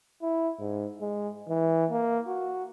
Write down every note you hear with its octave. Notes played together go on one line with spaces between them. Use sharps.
E4
G#2
G#3
E3
A#3
F#4